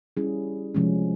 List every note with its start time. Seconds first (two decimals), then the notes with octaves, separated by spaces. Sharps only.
0.17 G3 C#4 E4 G#4
0.74 C3 F3 G#3 C#4